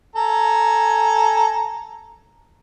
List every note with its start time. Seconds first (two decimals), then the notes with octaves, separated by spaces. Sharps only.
0.15 A4 G#5 A#5